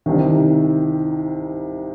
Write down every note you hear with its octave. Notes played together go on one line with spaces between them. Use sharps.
C2 C3 D#3